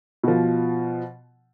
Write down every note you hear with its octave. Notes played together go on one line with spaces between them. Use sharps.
B2 F3